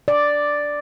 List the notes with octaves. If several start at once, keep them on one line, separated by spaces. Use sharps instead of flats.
D5